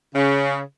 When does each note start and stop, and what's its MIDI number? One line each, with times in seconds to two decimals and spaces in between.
0.16 0.60 49